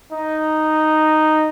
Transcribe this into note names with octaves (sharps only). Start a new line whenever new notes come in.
D#4